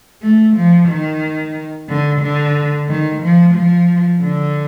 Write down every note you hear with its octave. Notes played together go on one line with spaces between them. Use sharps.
A3
F3
D#3
D3
D3
D#3
F3
F3
D3